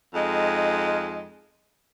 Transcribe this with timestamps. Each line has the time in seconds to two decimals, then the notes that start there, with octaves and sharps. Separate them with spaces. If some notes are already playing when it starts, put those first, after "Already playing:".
0.15 F2 G#3 D#4